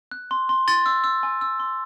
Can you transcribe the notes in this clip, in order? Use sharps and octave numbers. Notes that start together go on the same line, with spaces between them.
F#6
C6
C6
C6 A6
E6
E6
G#5
E6
C6